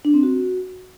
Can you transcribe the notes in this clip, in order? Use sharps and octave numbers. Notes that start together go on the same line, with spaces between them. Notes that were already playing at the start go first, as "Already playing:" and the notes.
D4
C4
F#4